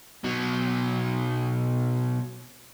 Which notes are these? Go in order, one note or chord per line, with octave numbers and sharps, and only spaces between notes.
B2 F#3